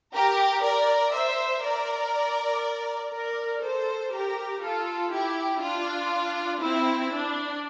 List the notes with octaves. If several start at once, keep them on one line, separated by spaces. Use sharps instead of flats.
G4 A#4
A#4 D5
C5 E5
A#4 D5
A#4 D5
A4 C5
G4 A#4
F4 A4
E4 G4
D4 F4
C4 E4
D4